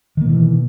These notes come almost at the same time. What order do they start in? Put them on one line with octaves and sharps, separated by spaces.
D#3 A#3 B2 E3